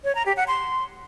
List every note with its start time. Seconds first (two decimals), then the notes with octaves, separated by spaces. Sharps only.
0.04 C#5
0.15 A#5
0.26 G4
0.37 F#5
0.48 C6